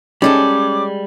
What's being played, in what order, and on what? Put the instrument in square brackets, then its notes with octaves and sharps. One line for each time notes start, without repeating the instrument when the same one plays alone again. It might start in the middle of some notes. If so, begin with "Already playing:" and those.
[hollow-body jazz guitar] G3 G#3 A4 [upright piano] C#4 [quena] D6